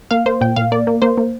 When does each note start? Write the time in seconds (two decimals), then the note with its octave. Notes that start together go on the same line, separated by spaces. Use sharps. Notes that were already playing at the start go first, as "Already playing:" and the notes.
0.11 A#3 F5
0.26 A#3 C5
0.41 A#2 G5
0.56 A#2 F5
0.72 A#3 D5
0.87 A#3
1.02 A#3 C5
1.18 A#3